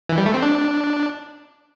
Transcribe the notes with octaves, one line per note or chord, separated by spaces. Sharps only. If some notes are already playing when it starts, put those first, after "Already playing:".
E3
G3
A3
C4
D4